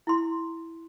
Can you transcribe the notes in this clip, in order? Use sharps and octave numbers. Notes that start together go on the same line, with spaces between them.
E4 C6